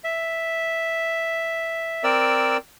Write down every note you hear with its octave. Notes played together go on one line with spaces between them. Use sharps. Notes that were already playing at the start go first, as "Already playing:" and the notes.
E5
C4 A#4 D5 E6